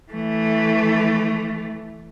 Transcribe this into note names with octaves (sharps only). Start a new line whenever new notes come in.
E3 A3